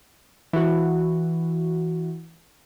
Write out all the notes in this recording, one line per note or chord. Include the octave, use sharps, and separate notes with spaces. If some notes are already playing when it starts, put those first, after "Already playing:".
E3 F#4